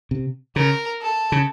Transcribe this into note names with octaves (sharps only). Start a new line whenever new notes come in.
C3
C#3 A#4
A4
C#3